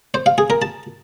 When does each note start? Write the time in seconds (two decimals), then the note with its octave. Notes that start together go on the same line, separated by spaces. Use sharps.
0.14 C5
0.26 F5
0.38 G#4
0.50 A#4
0.62 A5